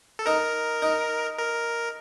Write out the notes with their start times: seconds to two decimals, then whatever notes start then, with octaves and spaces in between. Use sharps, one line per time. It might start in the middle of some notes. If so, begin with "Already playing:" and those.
0.19 A4
0.26 D#4 A#4
0.82 D#4
1.38 A#4